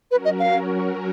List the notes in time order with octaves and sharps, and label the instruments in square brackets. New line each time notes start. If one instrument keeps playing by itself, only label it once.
[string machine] F#3 C#4 F#4 A#4 [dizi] B4
[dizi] D#5
F5